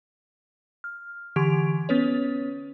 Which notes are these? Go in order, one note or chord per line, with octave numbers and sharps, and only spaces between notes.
F6
D3 E3 G4 C#6 G#6 D7
B3 C#4 B4 C#5